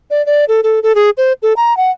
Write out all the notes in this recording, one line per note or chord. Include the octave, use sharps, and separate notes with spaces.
D5
D5
A4
A4
A4
G#4
C5
A4
A#5
F#5